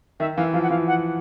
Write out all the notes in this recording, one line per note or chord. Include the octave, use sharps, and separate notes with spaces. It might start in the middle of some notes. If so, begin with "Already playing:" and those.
D#3 E5
E3 F5
F3 F5
F#5
E3 F5
F#5